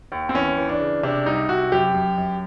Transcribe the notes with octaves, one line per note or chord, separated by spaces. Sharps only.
D#2
C4
E3 C#4
E3
D4
C#3
C3 D4
C2 D#4
C3 F#4
F#2 G4
F#2
F#2